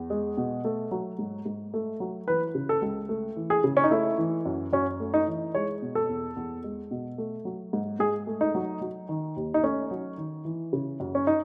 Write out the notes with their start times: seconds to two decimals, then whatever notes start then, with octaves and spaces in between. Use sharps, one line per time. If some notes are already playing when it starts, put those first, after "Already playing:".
Already playing: E2
0.10 G#3
0.37 B2
0.64 A3
0.91 F#3
1.19 G#2
1.46 G#2
1.74 A3
2.00 F#3
2.28 E3 B4
2.55 C#3
2.69 A4
2.82 C#2
3.09 A3
3.36 E3
3.50 G#4
3.64 C#3
3.77 C#4
3.84 D#4
3.91 A3 E4
4.18 E3
4.45 F#2
4.73 F#2 C#4
5.00 A3
5.14 D#4
5.27 E3
5.55 G#3 C#5
5.82 B2
5.95 A4
6.09 E2
6.36 E2
6.64 G#3
6.91 B2
7.18 A3
7.45 F#3
7.73 G#2
7.99 G#2 G#4
8.27 A3
8.41 D#4
8.55 F#3
8.81 F#3
9.09 D#3
9.36 D#2
9.54 D#4
9.63 A3 C#4
9.91 F#3
10.18 D#3
10.45 E3
10.73 C#3
11.00 F#2
11.15 C#4
11.27 D#4